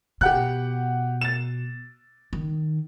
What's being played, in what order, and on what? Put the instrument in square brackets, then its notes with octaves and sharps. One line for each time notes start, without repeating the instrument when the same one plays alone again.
[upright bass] B2 [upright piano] G4 F#5 F#6
[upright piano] A6 E7
[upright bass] D#3